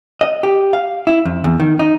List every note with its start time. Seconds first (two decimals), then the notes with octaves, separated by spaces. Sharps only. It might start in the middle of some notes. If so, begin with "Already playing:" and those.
0.21 D#5
0.43 G4
0.73 F5
1.07 E4
1.25 F2
1.44 E2
1.60 D#3
1.79 D#4